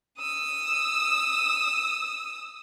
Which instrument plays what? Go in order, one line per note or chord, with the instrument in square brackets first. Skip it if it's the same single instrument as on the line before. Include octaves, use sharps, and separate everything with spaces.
[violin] D#6 E6